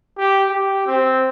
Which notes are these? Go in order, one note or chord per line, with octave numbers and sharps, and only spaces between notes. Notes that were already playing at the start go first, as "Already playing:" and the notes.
G4
G4
C4